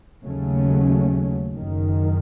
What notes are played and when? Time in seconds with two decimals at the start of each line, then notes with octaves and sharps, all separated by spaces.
0.23 D#2 C#3 F#3 A3 C#4
1.55 F#1 F#2 D#3